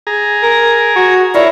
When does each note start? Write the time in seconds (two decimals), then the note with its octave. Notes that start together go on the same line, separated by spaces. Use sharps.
0.07 G#4 A#5
0.42 A#4
0.96 F#4
1.35 E4 F4 A#4 C#5 D5